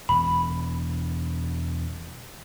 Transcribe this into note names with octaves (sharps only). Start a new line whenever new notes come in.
E1 B5